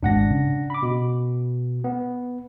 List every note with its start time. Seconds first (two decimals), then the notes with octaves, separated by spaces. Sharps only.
0.03 G#1 G#2 G#3 D4 F#5 A#6
0.30 C#3
0.70 B5 D6
0.83 B2
1.84 B3